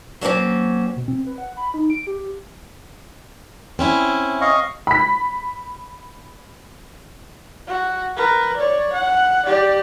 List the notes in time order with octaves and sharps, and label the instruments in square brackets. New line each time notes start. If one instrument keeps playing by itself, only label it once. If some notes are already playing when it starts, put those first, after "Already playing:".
[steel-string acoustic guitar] F#3 G3 A#3 C4 C#4
[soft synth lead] B2
C4
B4
F#5
B5
D#4
D7
G4
[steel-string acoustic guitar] C4 C#4 E4
[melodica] D#5 F5 C#6
[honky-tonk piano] B5 B6
[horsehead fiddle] F#4
A#4 B4
C#5 D5
F#5
G4 D5